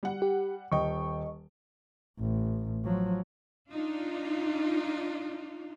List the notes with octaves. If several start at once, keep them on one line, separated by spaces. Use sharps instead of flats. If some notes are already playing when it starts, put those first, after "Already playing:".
G3 F#5
G4
D#1 D#5 G5 C#6
A1
F3 F#3
D4 D#4 F4